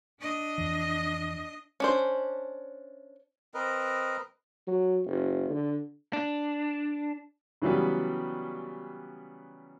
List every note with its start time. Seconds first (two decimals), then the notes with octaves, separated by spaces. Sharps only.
0.20 D4 D#5
0.58 F2 E3
1.80 C#4 D4 C5
3.54 C4 A#4 B4 D#5
4.67 F#3
5.06 F#1
5.49 D3
6.13 D4
7.62 C#3 E3 F#3 G3 B3